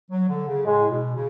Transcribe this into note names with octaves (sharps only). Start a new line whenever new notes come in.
F#3
D3
C#3
A2 G#3
B2
C#3